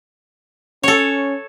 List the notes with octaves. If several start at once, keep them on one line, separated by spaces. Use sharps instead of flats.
C#4 A4 C#5